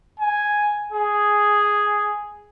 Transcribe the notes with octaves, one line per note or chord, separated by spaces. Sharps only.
G#5
G#4